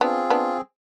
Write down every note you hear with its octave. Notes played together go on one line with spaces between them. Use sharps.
B3 C4 D4 F4 G#4
B3 D4